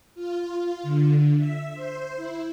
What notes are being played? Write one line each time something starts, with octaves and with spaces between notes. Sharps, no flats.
F4
D3
E5
C5
E4